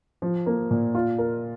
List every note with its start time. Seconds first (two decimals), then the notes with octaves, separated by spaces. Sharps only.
0.22 F3
0.46 A#3
0.71 A#2
0.95 F4
1.18 A#4